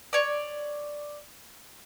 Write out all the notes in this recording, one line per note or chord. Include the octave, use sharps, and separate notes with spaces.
C#5 D5